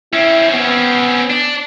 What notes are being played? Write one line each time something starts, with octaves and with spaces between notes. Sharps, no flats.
C4 C#4 E4
B3
D4